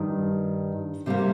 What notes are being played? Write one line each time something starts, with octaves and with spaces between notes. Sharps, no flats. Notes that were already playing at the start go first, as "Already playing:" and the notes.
Already playing: G2 D#3 G3
C3 G3 A#3